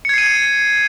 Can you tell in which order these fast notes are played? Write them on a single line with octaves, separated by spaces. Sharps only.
C#7 G#6 C7 D#7